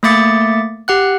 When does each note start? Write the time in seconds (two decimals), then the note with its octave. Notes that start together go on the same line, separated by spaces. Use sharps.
0.03 A3 A#3 E5 D6 A6 C#7
0.88 G4 F#5 F#6